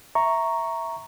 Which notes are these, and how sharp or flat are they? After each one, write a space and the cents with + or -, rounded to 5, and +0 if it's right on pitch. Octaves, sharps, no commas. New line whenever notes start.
E5 +0 A#5 +0 C#6 +0